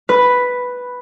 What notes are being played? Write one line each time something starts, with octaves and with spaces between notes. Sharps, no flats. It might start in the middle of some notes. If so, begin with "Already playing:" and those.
B4